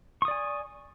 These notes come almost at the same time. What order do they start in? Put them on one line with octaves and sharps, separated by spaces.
C#6 D#6 D5 G#5